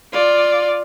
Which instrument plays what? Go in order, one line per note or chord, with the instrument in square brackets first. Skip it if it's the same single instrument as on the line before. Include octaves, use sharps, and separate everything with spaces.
[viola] F4 D5